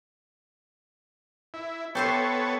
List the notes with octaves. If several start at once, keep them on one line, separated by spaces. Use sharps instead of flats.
E4
B3 G4 A4 C5 C#5 E5